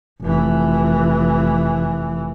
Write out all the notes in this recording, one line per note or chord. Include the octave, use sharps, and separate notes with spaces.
F1 E3